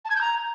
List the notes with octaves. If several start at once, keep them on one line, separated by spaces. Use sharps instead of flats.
A5
G#6
G6
A#5